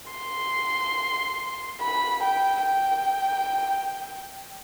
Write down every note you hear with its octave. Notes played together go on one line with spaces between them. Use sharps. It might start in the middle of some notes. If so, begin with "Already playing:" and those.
C6
B5
G5
G5